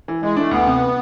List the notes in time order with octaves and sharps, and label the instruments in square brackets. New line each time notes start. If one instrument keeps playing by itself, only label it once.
[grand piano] E3
[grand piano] E3 [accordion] G#3
[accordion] A3 [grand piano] D4
[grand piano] D2 [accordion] B3
[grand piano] C3